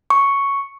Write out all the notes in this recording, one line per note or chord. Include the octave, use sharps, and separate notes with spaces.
C#6